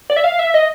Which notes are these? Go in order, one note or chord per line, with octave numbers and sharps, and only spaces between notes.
D5
E5
F5
E5
D#5